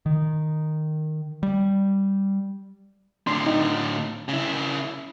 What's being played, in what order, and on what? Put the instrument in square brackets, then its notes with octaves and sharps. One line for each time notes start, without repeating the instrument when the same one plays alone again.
[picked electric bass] D#3
G3
[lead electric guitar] A2 D3 [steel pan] C6
[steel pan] D#4
[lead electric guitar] C#3 E4